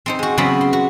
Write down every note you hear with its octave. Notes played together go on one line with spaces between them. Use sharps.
C4 D#4 C5
G#3 F#4
C#3 F#3 B3 C4 G5 B5
C6
F#4